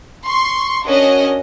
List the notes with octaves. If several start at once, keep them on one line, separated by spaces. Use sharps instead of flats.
C6 C#6
C#4 D4 F#4 A#4 D#5